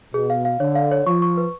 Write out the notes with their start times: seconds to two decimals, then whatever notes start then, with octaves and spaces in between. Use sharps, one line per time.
0.14 B2 G#4
0.30 F5
0.45 F5
0.60 D3 C#5
0.76 F5
0.91 C#5
1.06 F3 C#6
1.22 C#6
1.37 B4